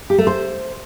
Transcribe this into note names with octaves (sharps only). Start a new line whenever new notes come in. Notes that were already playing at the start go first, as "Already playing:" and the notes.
G4
A3
C5